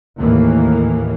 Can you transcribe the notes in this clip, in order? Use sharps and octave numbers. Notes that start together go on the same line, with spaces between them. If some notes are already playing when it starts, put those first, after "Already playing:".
D#2 A2 E3 A#3